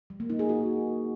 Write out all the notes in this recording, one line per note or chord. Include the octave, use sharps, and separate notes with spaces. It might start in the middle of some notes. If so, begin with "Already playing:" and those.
G3
A#3
D#4
G#4
F#4